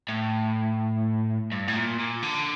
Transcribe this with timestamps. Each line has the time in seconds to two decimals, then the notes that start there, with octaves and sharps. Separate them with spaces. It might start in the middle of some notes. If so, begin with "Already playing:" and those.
0.09 A2
1.52 G2
1.68 A2
1.76 A#2
1.99 A#2
2.23 D3